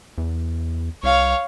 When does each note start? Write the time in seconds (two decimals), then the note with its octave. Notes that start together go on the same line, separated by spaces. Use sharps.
0.18 E2
1.03 C2 C#5 F5